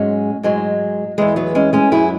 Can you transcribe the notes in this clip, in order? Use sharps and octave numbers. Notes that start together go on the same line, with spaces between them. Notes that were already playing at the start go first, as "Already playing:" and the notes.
Already playing: G#2 F#3 G#3 C#4
G#2 F#3 G#3
E2 E3 G#3
F#3 B3
G#3 C#4
G#3 C#4
F#2 F#3 E4 G#4